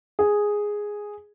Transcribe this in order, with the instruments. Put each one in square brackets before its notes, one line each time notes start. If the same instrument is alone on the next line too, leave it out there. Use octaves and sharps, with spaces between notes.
[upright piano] G#4